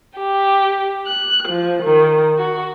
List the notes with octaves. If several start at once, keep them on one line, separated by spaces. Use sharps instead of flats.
G4
F#6
F3
D#3
F#4